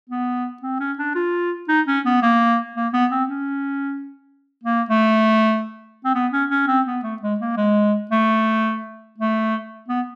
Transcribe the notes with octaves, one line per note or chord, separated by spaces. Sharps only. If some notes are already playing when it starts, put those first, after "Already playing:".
B3
C4
C#4
D4
F4
D#4
C#4
B3
A#3
A#3
B3
C4
C#4
A#3
A3
C4
B3
C#4
C#4
C4
B3
A3
G#3
A#3
G#3
A3
A3
B3